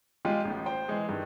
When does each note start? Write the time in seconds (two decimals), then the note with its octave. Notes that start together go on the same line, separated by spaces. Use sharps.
0.25 G3 G#3 F4 G4
0.45 A1 A2
0.66 C5 G5
0.88 E3 G#3 G#4
1.09 G2 D#3 E3